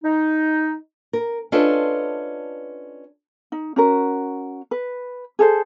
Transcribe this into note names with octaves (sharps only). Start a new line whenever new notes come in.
D#4
A#4
C#4 D4 F4 A4 B4 D#5
D#4
C#4 F#4 A#4
B4
G#4 A4 C5